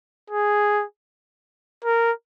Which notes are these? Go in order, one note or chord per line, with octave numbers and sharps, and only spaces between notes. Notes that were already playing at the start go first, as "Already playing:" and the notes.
G#4
A#4